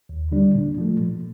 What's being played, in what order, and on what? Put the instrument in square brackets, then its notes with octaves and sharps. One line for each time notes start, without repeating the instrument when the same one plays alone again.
[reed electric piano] D#2
D3 G3 D4
A#2
F3 A3
A#2